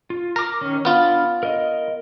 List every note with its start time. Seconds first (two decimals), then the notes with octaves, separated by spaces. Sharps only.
0.10 F4
0.36 A#4 A#5 D6
0.61 D#3 C#4
0.85 B3 D4 F4 B5 F6
1.43 A#4 D#5